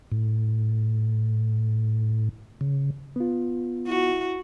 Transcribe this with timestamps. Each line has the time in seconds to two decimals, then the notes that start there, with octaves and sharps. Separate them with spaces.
0.12 A2
2.61 C#3
3.16 B3 F4
3.87 E4 F#4